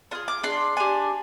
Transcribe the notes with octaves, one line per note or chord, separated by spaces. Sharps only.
D4 F4 G#4 D#6
D6
D4 G#4 C6
D4 G4 G#5